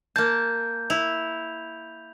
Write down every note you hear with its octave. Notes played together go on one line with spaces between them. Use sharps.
A#3 A5 G6
E4 F7